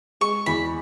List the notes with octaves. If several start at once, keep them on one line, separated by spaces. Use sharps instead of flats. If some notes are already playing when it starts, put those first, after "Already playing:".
G#3 C#6
E2 B5